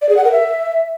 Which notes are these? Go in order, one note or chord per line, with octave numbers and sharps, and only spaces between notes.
D5
G#4
F#5
A#4
E5